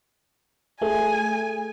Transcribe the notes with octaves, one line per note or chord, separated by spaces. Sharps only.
A3 G#4 G#5